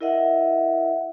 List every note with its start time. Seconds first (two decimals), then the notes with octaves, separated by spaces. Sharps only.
0.01 E4 A#4 D#5 E5 F#5